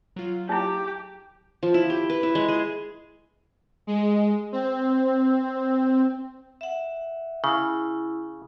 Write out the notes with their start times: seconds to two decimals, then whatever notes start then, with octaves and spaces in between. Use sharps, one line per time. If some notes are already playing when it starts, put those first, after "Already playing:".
0.16 F#3 F4
0.49 D#4 E4 G4
1.63 F3
1.74 E4
1.90 G4
2.10 B4
2.23 E4
2.35 G#3
2.48 G#4
3.87 G#3
4.52 C4
6.61 E5 F#5
7.44 C#3 E4